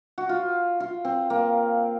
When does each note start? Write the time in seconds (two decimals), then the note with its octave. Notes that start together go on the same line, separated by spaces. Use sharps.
0.18 F#4
0.29 F4
0.80 F4
1.05 C4
1.30 A#3